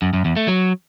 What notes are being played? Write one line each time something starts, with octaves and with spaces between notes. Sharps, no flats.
F#2
F#2
E2
A3
F#3